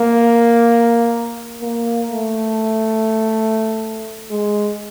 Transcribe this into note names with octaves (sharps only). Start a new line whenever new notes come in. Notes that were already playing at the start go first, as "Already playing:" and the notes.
Already playing: A#3
A#3
A3
G#3